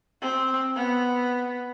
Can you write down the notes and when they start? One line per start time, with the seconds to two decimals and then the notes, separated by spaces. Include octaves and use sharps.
0.21 C4
0.76 B3